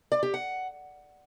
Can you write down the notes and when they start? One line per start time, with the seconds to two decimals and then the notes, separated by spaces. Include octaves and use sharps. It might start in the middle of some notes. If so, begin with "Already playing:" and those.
0.12 D5
0.23 G4
0.34 F#5